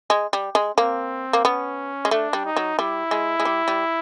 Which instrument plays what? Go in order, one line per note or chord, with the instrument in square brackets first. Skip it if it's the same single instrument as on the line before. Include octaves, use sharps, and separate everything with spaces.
[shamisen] G#3
G3
G#3
[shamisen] A#3 [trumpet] C4
[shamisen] A#3
[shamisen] B3 [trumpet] C#4
[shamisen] G#3
[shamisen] A3 [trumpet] D4
[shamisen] G3
[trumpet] D#4
[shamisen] F#3
[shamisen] G3 [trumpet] E4
[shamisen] G#3
G#3
G3
G3